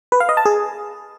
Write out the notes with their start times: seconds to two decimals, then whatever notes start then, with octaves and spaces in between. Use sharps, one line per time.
0.12 B4
0.20 F5
0.29 D#5
0.37 A5
0.45 G#4